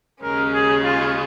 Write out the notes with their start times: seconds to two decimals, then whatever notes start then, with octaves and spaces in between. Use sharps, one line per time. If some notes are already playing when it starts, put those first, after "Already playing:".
0.23 D#2 C#3 G#3 C#4 A#4
0.54 G#4
0.83 F4